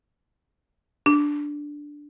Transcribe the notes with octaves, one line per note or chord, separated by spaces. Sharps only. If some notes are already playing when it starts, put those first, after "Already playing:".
D4